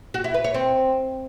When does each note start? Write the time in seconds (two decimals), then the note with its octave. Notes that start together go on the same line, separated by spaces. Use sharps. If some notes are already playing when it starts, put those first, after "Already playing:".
0.14 F#4
0.24 E4
0.34 B4
0.44 C#5
0.54 C4